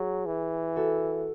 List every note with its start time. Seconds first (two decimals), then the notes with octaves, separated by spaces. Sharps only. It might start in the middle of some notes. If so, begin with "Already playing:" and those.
Already playing: F#3 G#4
0.26 E3
0.76 F#4 A4